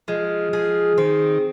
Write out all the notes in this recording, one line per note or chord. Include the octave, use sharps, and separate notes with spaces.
F3 G#3
F3 G#4
D#3 C4